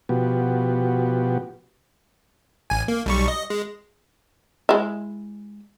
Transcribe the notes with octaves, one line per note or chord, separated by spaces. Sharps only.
B2 F3 B3 F#4 G4
A1 G#5
A#3
B1 G3 C#6
D#5
G#3
G#3 E4